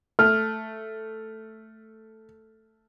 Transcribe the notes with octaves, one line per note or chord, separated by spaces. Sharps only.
A3 F6